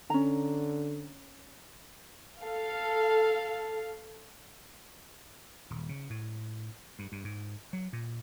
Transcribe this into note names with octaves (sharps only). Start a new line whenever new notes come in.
D3 C#4 A#5
A4 F5
D#1
C#3
A2
G2
G2
G#2
F#3
A#2